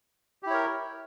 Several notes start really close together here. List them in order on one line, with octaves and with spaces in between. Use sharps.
G4 E4 C#5 A#4